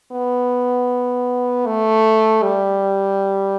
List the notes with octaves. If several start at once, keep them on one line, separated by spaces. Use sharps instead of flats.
B3
A3
G3